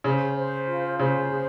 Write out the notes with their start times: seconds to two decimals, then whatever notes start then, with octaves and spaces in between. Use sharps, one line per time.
0.04 C#3 C5
0.36 C5
0.67 F4
0.98 C#3 C5
1.30 G#4